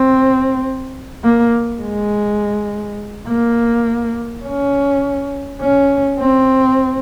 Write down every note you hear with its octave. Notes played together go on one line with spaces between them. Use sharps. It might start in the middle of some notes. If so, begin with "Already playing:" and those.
Already playing: C4
A#3
G#3
A#3
C#4
C#4
C4